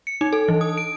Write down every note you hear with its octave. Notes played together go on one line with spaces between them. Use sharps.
C#7
D#4
A4
E3
D#6
D7